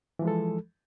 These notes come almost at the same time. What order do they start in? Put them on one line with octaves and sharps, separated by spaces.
E3 F3 G#3 A4